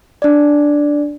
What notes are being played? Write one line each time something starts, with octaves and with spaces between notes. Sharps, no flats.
D4 D5